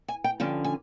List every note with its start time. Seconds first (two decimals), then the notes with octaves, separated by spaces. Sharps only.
0.08 G#5
0.24 G5
0.40 G2 D3 F3 C#4 G5
0.64 G#5